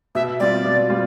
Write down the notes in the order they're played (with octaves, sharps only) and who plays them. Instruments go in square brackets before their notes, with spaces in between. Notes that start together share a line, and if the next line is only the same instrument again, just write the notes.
[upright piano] B2 [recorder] E5
[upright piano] G3 C4 F4 [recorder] D5
[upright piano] B2
G3 C4 F4